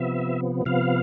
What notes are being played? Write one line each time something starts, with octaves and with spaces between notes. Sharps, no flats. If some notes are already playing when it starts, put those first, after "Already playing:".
Already playing: C3 F3 B3 E5
C3 F3 B3 F5